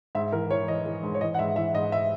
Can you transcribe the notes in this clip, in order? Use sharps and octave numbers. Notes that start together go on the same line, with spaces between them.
G#2 E5
E3 A#4
E3 C#5
E3 D#5
E3
G#2
C#5
E3 D#5
F#5
G#2 E5
E3 E5
G#2 D#5
E5